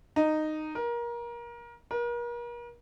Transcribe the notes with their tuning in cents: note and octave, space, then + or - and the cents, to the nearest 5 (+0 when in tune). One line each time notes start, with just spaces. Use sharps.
D#4 -10
A#4 +25
A#4 +40